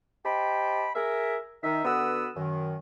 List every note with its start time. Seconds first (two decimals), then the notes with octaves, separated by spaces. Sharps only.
0.25 G4 C5 D#5 G5 A5 B5
0.95 G#4 A#4 E5
1.64 D#3 D#4 E5
1.85 D3 B3 F#4 B4 D#6 E6
2.36 F#2 D#3